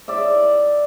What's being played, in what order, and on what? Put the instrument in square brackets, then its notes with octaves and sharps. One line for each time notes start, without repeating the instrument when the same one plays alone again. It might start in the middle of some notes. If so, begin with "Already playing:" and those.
[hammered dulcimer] D5 E5